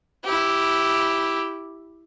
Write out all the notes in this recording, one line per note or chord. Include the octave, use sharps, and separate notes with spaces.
E4 G4